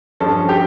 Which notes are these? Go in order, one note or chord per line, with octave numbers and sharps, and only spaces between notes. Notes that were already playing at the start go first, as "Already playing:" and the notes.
G2 F3 C#4 A4
G4